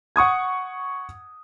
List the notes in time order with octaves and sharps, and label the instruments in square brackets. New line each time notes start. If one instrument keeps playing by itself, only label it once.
[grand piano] F#5 C#6 D#6 G#6